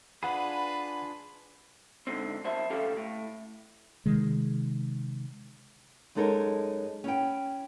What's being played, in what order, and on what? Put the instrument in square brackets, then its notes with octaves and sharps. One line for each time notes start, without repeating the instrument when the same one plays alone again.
[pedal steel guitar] D4 F4 G#4 [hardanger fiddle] B4 [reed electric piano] F#5 B5
[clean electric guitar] G#2 D3 C4
F#2 G3 C5 E5 A5
D2 C3 C#4 G4 A4 F5
A2
[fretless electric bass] C3 D#3 G#3
[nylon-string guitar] F#2 G#3 D#4 A4 A#4 C#5
C#4 E4 G5